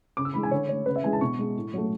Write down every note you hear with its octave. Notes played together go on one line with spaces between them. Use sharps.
C#3 D6
E6
E3 G#3 B5
G#5
D3 C#5
A3 C#5
C#3 B4
E5
E3 G#3 G#5
A5
B2 C#6
G#3
A2
F#3 A3